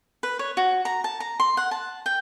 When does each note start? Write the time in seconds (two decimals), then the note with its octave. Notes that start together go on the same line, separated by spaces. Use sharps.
0.23 B4
0.39 C#5
0.57 F#4
0.85 A#5
1.04 A5
1.20 A#5
1.40 C6
1.57 F#5
1.71 A5
2.06 G5